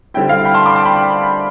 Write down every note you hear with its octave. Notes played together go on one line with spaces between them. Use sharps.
D3 G3 C4 E4 G5
F5
G5 B5
A5 C6
B5 D6
A5 C6
G5 B5
G5